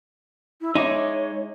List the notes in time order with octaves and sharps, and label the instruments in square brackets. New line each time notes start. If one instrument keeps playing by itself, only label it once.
[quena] E4
[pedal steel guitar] G#3 E5 D6 [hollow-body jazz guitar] D#4 [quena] C#5